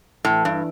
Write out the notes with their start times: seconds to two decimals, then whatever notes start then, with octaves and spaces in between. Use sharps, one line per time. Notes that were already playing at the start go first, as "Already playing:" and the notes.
0.25 A2 E3
0.45 G2